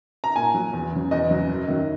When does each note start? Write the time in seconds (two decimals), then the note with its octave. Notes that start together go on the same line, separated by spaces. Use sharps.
0.24 A#5
0.36 A#2 G#5
0.54 F#3
0.73 E2
0.92 C#3 F#3
1.11 E2 D#5
1.31 C#3 F#3
1.49 F#2
1.68 D#3 F#3